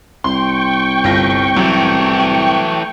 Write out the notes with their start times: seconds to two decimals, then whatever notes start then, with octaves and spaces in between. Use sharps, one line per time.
0.24 C2 G5 C6 C#6
1.04 G1 F4 A#6
1.56 E3 F#3 A3